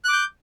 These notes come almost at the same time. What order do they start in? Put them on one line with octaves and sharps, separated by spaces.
F#6 D6 G6